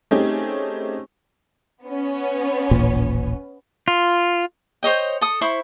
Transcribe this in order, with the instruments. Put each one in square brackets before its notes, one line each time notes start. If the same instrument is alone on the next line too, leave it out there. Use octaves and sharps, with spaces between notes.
[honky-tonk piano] A3 C4 C#4 D#4 G4 G#4
[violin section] B3 C#4
[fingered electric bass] D#1 A1 A#2
[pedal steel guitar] F4
[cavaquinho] C5 C#5 D#5 G5
A4 D#6
E4 C5 B5 C#6